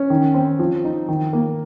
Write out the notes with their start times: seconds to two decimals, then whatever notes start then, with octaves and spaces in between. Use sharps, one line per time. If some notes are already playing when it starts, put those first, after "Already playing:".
Already playing: C#4
0.10 D#3
0.34 C4
0.59 F3
0.84 D#4
1.08 D#3
1.33 A#3